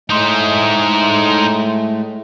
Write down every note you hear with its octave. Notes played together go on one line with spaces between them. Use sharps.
A2 G#3 A3 D#4 C5